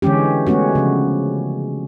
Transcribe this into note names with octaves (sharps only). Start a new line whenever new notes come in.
D3 E3 G#3 C#4 G4
G#3 A3 B3 C#4 F#4
C#3 F3